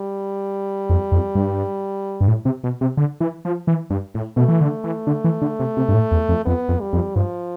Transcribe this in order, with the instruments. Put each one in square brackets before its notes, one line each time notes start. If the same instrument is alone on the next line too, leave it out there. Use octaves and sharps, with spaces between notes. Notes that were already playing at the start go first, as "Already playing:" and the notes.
Already playing: [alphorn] G3
[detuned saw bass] F2
F2
G2
G2
A2
C3
B2
C3
D3
E3
F3
E3
G2
A2
[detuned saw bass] B2 [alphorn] A3
[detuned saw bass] E3
D3
E3
D3
E3
D3
C3
C3
G2
A2
E2
F2
[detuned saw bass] F2 [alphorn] B3
[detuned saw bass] F2
[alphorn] G3
[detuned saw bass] F2
[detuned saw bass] G2 [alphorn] F3